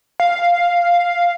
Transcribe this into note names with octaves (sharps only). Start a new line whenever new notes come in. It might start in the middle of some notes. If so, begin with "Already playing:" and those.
F5